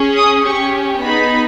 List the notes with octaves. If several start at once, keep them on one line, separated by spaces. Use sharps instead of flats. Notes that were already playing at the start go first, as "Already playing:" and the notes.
Already playing: C#4 G#4
D#6
C#4 G4 C#6
B3 D#4 G#4 B5